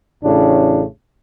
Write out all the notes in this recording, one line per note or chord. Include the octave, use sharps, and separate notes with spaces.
A1 A2 C#3 D4